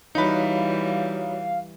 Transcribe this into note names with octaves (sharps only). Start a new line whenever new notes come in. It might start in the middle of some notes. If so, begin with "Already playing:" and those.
E3 G3 D#4 F#4 C#5 F5 B5